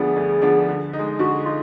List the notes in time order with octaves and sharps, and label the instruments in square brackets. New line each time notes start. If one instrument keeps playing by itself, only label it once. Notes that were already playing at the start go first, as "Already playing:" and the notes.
Already playing: [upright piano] D2 D3 F3 B3 D4 [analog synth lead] G#4
[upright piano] D2
D3 F3 B3 D4
D3
D#4
G#3
[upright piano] D3 [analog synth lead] F#4
[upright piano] D#4 [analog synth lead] F4